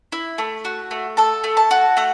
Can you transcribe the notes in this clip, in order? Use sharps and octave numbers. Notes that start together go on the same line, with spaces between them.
E4
A3
F#4
A3
A4 A5
A3
A5
F#4
A3 F#5